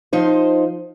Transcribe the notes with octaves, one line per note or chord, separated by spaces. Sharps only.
F3 D#4 C5